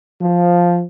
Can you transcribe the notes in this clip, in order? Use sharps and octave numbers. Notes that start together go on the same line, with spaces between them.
F3